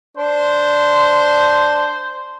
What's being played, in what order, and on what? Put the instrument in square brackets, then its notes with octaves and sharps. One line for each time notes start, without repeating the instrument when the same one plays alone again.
[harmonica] D4 [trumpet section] C5